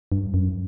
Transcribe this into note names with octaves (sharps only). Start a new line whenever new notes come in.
G2
F#2